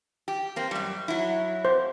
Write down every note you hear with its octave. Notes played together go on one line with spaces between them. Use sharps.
G4
A#3 C4
F#2 G3
F#3 E4
C5